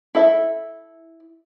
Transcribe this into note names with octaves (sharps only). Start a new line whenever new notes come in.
E4 A4 E5